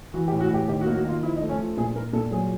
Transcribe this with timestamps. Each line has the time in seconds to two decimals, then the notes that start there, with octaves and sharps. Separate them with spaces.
0.14 E3 F#4
0.28 G4
0.32 A2
0.40 F#4
0.51 A2 G4
0.68 D#3 G4
0.81 F#4
0.86 A#3
0.95 F#4
1.04 D#3 F4
1.22 F3 E4
1.37 D#4
1.41 A3
1.49 C#4
1.58 F3
1.77 A#2 G#4
1.95 A#2 A#4
2.13 A#2 A4
2.31 F#3 G#4